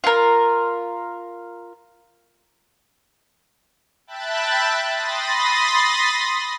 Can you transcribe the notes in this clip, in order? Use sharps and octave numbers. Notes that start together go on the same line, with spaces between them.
F4 A#4
E5 G5 A5 B5 F#6 A6
B5 C6 D#6 A6 A#6